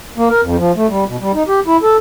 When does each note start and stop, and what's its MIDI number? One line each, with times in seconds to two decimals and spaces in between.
0.18 0.29 58
0.30 0.41 70
0.42 0.56 41
0.58 0.72 53
0.76 0.87 57
0.89 1.04 55
1.08 1.16 47
1.21 1.32 55
1.34 1.43 63
1.48 1.60 67
1.67 1.77 64
1.83 1.97 69